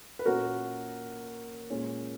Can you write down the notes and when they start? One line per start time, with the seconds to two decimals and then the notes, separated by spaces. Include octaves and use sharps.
0.19 B4
0.25 A#2 A#3 C#4 F#4 A#4
1.70 A#2 G#3 C#4